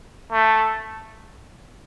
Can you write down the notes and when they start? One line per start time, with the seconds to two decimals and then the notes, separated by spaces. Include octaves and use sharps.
0.32 A3